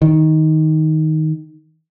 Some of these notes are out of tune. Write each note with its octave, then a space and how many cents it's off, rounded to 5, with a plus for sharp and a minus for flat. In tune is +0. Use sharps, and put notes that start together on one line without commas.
D#3 +10